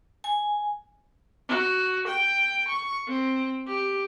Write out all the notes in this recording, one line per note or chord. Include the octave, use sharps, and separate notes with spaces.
G#5
F#4
G5
C#6
C4
G4